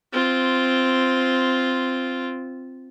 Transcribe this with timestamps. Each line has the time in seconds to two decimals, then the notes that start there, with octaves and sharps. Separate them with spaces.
0.12 C4 F4